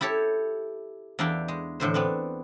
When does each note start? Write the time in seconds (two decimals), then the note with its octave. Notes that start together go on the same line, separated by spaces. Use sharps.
0.01 E4 G4 A4 C#5
1.19 E2 D4 E4 F5 G5
1.48 G#3
1.80 E2 A2 D3 C5
1.94 B3 C4 D4